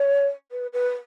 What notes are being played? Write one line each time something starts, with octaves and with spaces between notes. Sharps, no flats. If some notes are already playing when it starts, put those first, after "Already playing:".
Already playing: C#5
B4
B4